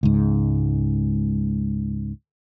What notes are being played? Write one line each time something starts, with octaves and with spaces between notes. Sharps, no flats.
C#2 G#2